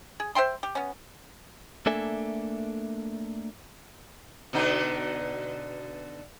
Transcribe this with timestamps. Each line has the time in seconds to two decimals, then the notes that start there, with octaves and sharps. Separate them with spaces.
0.20 G#4
0.35 C5 E5 G5 C6
0.63 G4
0.75 B3 C#4
1.86 A3 A#3 D4 A4 E5 G#5
4.53 B2 D3 D#4